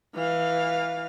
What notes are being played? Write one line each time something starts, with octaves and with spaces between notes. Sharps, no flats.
E3 F5